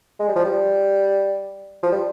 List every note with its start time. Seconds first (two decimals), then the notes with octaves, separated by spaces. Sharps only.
0.20 G#3
0.28 G3
0.36 F3
0.44 G3
1.83 F3
1.92 G3